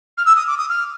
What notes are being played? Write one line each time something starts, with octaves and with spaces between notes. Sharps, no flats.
F6
E6
D#6
D6
D#6
F6